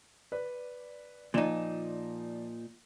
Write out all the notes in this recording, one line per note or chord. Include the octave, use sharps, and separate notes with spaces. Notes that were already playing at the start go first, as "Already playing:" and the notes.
B4 D5
A#2 F3 D#4 D5 E7